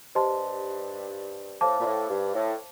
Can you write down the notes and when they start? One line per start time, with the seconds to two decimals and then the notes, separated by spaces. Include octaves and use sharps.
0.15 G2 G4 C5 D#5 A5 C6
1.61 A2 C5 F5 A5 D6
1.80 A#2
1.85 A2
2.09 G2
2.34 A2